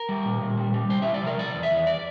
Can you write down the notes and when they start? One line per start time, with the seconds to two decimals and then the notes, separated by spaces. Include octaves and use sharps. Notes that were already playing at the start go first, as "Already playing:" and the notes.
Already playing: A#4
0.09 G3
0.25 A#2
0.41 A#2
0.57 G3
0.74 G3
0.89 C3 C5
1.02 C3 E5
1.14 D5
1.22 F3 A#4
1.38 F3 D5
1.55 E2
1.63 E5
1.71 E2
1.87 D5